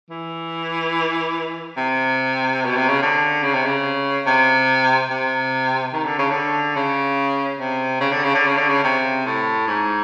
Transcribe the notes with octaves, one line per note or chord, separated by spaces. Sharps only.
E3
C3
B2
C3
C#3
D3
C#3
C3
C#3
C3
C3
D#3
D3
C#3
D3
C#3
C3
C#3
D3
C#3
D3
C#3
D3
C#3
C3
A2
G#2